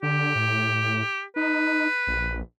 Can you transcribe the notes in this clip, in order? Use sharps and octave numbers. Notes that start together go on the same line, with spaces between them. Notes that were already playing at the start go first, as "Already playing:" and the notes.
D3 G4
A2
D#4 B4
A#1